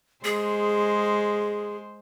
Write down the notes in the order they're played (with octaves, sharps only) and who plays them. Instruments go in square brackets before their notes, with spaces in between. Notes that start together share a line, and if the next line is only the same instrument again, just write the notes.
[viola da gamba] G#3 C5 [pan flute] G#4